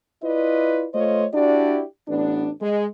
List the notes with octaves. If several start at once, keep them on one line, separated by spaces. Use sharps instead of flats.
E4 F4 B4 D5 D#5
A3 F4 C5 C#5 D#5
D4 E4 F#4 G4 D5
A1 B3 D4
G#3